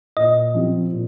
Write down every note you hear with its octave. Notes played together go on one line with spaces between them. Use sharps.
A#2 D#5
F3 C4 G4
A#2